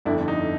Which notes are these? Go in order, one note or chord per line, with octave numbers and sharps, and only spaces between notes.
G1 F2 D3 D4 E4
D#4